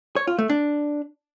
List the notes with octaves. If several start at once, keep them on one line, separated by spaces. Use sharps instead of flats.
C#5
F4
A3
D4